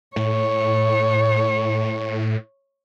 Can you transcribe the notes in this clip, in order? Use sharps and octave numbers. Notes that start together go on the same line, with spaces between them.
A2 C#5